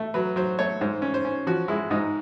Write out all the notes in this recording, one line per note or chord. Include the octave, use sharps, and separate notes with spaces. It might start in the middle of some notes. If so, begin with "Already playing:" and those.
Already playing: A3
F#3 B4
F#3 C5
A3 C#5
G#2 C5
C#4
C5
C#4
F3 F#4
G#3 E4
G#2 D#4